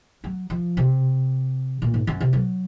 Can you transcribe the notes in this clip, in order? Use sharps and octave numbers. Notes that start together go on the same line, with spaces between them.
F#3
F3
C3
A#2
G#2
F#2
C3
F#3